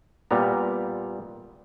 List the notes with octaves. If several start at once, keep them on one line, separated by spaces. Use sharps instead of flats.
A#2 G3 B3 A#5